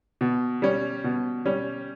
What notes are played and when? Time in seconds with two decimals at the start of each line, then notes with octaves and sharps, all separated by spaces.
0.21 B2
0.62 G3 C#4
1.04 B2
1.45 G3 C#4